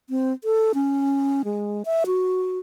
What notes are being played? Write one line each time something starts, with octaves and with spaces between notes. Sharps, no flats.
C4
A4
C#4
G#3
E5
F#4